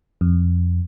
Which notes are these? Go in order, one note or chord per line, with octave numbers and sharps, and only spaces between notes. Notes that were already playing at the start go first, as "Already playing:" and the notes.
F2